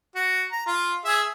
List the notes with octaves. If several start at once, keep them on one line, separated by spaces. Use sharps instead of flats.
F#4
A#5
F4
G#4 E5